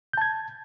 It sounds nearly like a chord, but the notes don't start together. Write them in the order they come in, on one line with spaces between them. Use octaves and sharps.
G6 A5 G#6